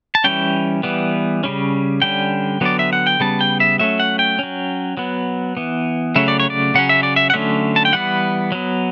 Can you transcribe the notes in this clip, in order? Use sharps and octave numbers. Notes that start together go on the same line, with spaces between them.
A5
E3 G3 C#4 G5
E3 G3 B3
C#3 G3 C#4
D3 G3 C#4 G5
D3 F#3 B3 D5
E5
F#5
G5
C#3 G3 B3 A5
G5
E5
F#3 A3 C#4 E5
F#5
G5
F#3 C#4
F#3 B3
E3 B3
C#3 F#3 A3 C#4 E5
D5
C#5
D5
C#3 F#3 C#4 F#5
E5
D5
E5
F#5
D3 F#3 A3 C#4 E5
A5
G5
E3 G3 B3 F#5
F#3 B3